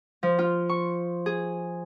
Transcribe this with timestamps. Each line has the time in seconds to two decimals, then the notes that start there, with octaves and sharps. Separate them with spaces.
0.23 F3
0.39 F4
0.69 C#6
1.26 G#4